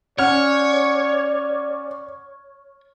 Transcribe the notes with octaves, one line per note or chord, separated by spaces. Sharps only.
C#4 C#5 D5 F#5 F6